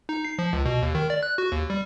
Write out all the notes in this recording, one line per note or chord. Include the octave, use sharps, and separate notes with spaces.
D#4
C7
F3
C#2
B2
D#2
D#3
D5
F#6
F#4
D#2
G3